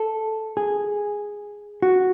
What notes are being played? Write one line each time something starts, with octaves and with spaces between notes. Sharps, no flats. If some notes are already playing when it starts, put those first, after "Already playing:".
Already playing: A4
G#4
F#4